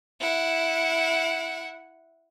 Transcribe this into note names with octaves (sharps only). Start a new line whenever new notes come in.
E4 F#5